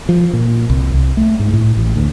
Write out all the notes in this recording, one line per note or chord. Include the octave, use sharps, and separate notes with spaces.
F3
A#2
C2
C2
A3
G#2
A2
A1
D2